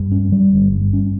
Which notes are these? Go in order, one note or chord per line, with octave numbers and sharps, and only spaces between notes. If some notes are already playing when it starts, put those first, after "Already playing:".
Already playing: G2
C#4
G3
G1
G2
C#4